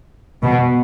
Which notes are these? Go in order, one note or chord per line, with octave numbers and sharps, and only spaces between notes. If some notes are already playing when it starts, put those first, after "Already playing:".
B2